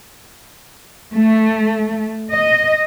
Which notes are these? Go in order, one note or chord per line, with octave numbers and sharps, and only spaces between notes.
A3
D#5